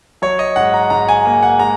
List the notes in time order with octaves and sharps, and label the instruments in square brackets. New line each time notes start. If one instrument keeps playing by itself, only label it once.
[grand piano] F#3 C#5
D#5
G#2 F#5
A#5
G#2 A#5
G#5
A#3
F#5
G#3 A#5